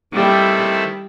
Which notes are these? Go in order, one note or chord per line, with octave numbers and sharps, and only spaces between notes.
D#3 G3 A3 C4 E4 A4